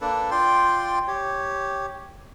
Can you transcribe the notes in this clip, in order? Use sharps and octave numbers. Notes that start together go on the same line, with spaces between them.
A#3 D4 A4 B4
F4 D5 G5 C6
G4 C#5